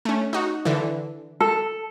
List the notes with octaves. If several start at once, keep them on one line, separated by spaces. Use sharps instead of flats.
A3 C#4
D#4 F#4
D3 E3
A4